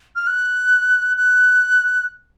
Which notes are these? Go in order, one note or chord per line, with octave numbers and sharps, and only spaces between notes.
F6
F#6
F#6